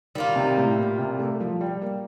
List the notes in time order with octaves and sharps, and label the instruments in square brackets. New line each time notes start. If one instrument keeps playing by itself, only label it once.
[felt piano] D#3 [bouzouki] G3 A#3 F4
[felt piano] C3
A2
A#2
C3
A3
F3
G3
A#3